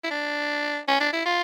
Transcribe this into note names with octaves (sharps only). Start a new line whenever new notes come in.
E4
D4
C#4
D4
E4
F4